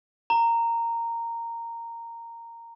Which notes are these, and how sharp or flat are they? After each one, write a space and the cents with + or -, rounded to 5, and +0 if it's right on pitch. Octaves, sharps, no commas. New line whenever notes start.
A#5 -10